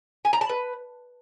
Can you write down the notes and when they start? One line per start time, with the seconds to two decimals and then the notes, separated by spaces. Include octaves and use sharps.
0.25 G#5
0.33 A#5
0.41 A5
0.49 B4